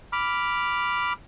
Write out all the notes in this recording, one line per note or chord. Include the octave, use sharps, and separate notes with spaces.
B5 D6 F6